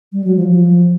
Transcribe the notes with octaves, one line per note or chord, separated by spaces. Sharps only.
G3
F#3
F3
F3